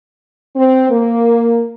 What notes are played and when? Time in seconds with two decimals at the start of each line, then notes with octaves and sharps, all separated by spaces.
0.54 C4
0.90 A#3